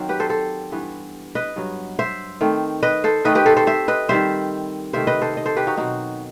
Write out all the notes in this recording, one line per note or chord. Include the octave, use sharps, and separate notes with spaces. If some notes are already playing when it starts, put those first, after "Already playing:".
Already playing: D#3 F#3 C4
G4 B4
A4 C5
A4 C5
G2 E3 B3
B4 D#5
G2 F#3 B3
C5 E5
D#3 A3 C4
B4 D#5
A4 C5
D#3 A3 C4 B4 D#5
G4 B4
A4 C5
A4 C5
C5 E5
B4 D#5
D#3 G3 C4 C5 E5
C3 D#3 A3 C5 E5
B4 D#5
A4 C5
D#5
A4 C5
G4 B4
D#4 F#4
B2 F#3 C4 D#4 F#4